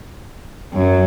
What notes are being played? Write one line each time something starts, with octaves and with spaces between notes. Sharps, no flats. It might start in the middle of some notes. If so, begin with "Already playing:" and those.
F#2